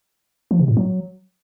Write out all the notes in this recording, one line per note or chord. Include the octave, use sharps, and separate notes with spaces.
F3
C3
A2
F#3